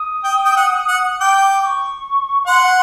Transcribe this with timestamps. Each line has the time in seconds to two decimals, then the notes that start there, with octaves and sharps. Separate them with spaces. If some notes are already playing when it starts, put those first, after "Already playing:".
Already playing: D#6
0.24 G5
0.45 G5
0.57 F#5
0.88 F#5
1.20 G5 D6
1.41 D6
1.62 D6
1.66 C#6
2.47 F#5 C6